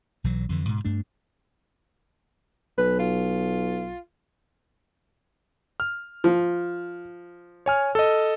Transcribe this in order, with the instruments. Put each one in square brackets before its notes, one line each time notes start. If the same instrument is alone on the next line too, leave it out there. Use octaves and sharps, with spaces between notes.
[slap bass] B1 E3 F#3
F2 D3 E3
G#2 B2
G2 A3 D4
[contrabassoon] B1 [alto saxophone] B4
[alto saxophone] F4
[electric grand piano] F6
[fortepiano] F3
[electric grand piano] C#5 G#5 F6
A4 D#5